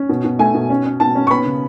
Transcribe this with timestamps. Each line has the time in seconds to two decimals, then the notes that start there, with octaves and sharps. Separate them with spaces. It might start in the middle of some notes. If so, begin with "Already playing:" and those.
Already playing: C#4
0.09 B2
0.24 B2
0.39 A3 G#5
0.54 B2
0.70 C#4
0.85 C#4
1.00 B2 A5
1.15 C#4
1.27 C#6
1.30 B3 B5
1.46 C#3